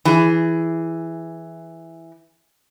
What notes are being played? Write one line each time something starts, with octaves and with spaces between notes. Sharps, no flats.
E3 G#4